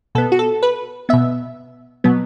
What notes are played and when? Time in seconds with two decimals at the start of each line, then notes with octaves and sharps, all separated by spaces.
0.15 B2 B3 A4
0.32 F#4
0.39 A4
0.63 B4
1.09 B2 B3 E5
2.04 B2 F#3 B3